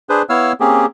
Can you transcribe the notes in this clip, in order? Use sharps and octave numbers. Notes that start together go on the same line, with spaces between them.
D4 G#4 B4 C5
B3 E4 C#5 F5 E6 F6
A#3 C4 C#4 G4 G#4